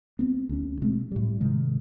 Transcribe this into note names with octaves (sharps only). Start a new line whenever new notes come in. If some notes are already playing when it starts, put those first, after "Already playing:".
B3 C4
D2 C#4
B2 G#3 A3 C4
A2 G3
G#2 C3 D#3 G#3